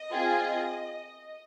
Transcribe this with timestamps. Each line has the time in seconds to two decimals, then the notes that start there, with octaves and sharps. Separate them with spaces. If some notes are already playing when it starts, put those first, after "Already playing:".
Already playing: D#5
0.11 C4 F4 G#4